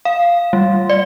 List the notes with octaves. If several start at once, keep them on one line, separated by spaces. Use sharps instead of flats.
F5
G3
D5